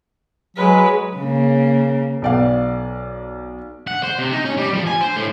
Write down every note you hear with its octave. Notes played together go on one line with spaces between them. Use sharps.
F#3 G#3 B4
C#3 A#3
B1 D5 F5
F#5
C5
C3
D#4
C#4
G3
F3
G#5
C5
A2